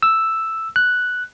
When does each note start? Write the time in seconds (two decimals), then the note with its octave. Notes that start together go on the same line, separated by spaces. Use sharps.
0.03 E6
0.76 F#6